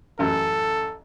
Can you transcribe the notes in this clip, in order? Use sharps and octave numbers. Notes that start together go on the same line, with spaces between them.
A1 F#2 A4